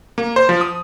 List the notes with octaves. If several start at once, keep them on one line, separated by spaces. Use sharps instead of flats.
A#3
C5
F3
D#6